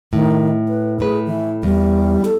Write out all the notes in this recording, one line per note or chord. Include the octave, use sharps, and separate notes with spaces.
A2 D#3
B4
A2 G#4 B4
E3
E2 G3
A4